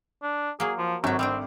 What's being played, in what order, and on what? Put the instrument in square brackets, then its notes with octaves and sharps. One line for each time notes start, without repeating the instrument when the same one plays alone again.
[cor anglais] D4
[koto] F#3 A#3 [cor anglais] G#4
[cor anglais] F3
[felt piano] G#1 [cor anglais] F#3 [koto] A3 E5
[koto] G3 A3 D4 [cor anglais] C4